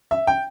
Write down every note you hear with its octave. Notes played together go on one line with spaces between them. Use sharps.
E5
G5